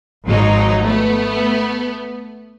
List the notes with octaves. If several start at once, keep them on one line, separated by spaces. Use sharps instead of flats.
G#1 F3 F#3 D#4
A3 B3